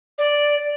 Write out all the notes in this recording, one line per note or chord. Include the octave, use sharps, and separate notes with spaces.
D5